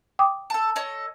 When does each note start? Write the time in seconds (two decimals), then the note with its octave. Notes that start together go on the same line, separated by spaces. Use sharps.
0.19 G5 D6 D#6
0.50 A4 A5
0.76 A4 C#5 D#5